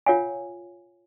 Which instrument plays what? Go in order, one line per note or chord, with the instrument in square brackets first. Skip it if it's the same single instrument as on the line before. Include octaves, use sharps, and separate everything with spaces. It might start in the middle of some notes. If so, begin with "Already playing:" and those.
[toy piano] F4 A#4 C#5 F5 F#5 G#5